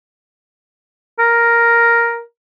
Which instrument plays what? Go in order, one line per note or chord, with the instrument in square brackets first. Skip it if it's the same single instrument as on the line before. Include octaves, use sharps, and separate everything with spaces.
[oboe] A#4